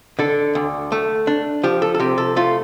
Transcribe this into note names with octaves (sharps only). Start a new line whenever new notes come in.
D3 A4
D2
A3
D4
F3 G4
A4
A4
C3 G4
A4
A3 F4